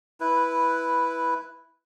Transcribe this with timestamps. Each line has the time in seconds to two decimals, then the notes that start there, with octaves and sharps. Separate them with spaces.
0.20 E4 B4